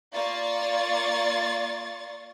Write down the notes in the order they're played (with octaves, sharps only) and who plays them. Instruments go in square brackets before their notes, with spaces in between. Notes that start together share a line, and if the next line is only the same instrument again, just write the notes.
[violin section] A#3 F4 D5 C#6 A6